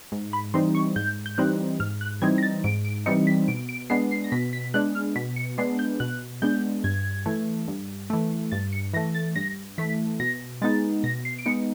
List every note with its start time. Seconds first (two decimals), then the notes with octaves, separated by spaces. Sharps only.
0.12 G#2
0.33 B5
0.54 E3 G3 C4 D#4 C6
0.75 C#6
0.96 G#2 G6
1.26 G6
1.38 E3 G3 C4 D#4 F#6
1.80 G#2 F6
2.01 F#6
2.22 E3 G3 C4 D#4 G#6
2.38 A#6
2.43 A6
2.64 G#2 D7
2.85 D7
3.06 E3 G3 C4 D#4 C#7
3.27 B6
3.48 B2 D7
3.69 D7
3.90 G#3 B3 D4 C7
4.11 C7
4.24 A#6
4.32 B2 B6
4.53 B6
4.74 G#3 B3 D4 F#6
4.95 F6
5.16 B2 B6
5.36 C#7
5.58 G#3 B3 D4 C7
5.79 G6
6.00 B2 F#6
6.42 G#3 B3 D4 G6
6.84 G2 G#6
7.26 E3 A3
7.68 G2
8.10 E3 A3
8.52 G2 A6
8.73 C#7
8.93 E3 A3 A#6
9.15 A6
9.36 G2 A#6
9.78 E3 A3 B6
10.20 B2 A#6
10.62 G#3 B3 D#4 A6
11.04 B2 A#6
11.25 C7
11.38 D7
11.46 G#3 B3 D#4 C#7